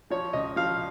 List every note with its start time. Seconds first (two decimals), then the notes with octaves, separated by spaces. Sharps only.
0.10 F3 C#5
0.33 C#2 D#5
0.56 F3 F5